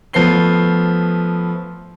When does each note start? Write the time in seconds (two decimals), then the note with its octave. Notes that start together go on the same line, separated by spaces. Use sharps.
0.13 F3 A3 B3 C7 G7